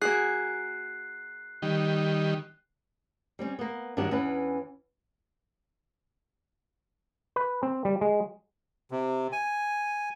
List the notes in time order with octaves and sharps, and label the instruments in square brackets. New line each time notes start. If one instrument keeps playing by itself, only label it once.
[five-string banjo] A#3 F#4 G#4 [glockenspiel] F#6 C7
[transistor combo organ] D#3 G3
[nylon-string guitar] G3 C4 C#4
A#3 B3
G2 D#3 F#3 D4 G4
E2 E3 C#4 D4 B4
[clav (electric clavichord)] B4
C4
G3
G#3
[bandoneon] C3
G#5